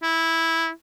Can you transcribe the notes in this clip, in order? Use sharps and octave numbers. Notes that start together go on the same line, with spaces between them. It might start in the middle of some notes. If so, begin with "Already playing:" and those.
E4